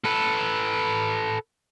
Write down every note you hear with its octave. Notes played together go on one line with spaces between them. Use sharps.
A4 B4